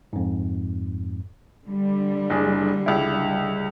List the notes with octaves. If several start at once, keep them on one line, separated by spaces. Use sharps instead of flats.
F2 G#2
D3 G3
F#1 D4 G#4
C#2 E4